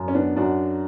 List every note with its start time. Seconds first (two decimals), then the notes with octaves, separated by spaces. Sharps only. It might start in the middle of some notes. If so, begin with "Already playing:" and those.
Already playing: F#2
0.08 C#4
0.14 B3 D4
0.36 F#2 D4 F#4